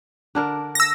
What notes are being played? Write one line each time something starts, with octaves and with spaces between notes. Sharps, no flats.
D3 D4 A#4
E6 A#6